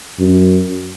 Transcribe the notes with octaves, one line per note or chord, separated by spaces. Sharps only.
F#2